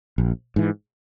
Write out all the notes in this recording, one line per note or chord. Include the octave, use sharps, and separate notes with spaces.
A#1
G#2 E3